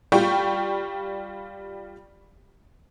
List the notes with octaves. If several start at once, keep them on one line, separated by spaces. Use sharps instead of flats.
G3 F4 G5 C#6